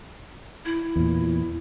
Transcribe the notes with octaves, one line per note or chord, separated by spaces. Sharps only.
E4
E2 A#2